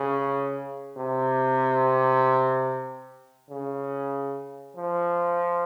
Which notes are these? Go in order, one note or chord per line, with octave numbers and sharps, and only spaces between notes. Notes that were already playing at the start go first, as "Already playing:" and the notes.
Already playing: C#3
C3
C#3
F3